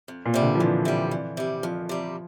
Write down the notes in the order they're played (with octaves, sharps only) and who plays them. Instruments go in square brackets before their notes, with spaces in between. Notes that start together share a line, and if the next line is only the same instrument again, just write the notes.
[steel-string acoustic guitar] F2
[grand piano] A#2
[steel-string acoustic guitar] C3 G3
[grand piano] D3
F3
[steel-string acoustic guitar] F2 [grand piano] E3
[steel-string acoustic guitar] C3 G3
F2
C3 G3
[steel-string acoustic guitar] F2 [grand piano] F3
[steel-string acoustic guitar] C3 G3